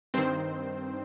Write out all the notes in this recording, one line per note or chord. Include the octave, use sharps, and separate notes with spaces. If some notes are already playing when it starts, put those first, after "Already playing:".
G2 D#3 C4 C5